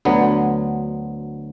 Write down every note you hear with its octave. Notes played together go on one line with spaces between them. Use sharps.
D2 D3 F#3 B3